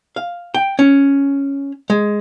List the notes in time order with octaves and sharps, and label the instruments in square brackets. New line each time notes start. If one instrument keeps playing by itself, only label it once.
[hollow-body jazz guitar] F5
G5
C#4
G#3